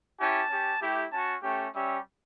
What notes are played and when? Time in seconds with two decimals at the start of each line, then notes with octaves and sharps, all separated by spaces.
0.19 C#4 E4 G4 A5
0.50 C#4 G4
0.81 A3 E4 G4
1.12 C#4 F#4 A5
1.43 A3 C#4 G4 G5
1.74 G3 C#4 G4 E5